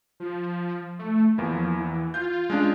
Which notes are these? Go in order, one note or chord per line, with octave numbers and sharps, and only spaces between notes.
F3
A3
E2 F3 A#3 E4
E3
F4 G6
G#3 C#4 D4